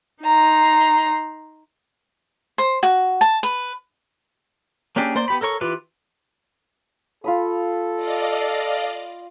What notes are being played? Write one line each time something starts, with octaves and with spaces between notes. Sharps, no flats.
D#4 A#5 C6
C5
F#4
A5
B4
A#3 C#4 D4 G4 G#4
A#3 C5 D5 C6
B3 G4 B5
A4 A#4 C#5 C#6
E3 F4 G4 B4
F4 A4 B5 D#6
D5 D#5 F5